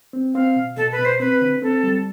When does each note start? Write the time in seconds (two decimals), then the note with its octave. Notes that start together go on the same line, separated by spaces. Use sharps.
0.13 C4
0.34 C4 F5
0.56 B2
0.77 B2 A4
0.92 B4
0.99 B2
1.05 C5
1.20 C4 B4
1.41 D3
1.62 C4 A4
1.83 G3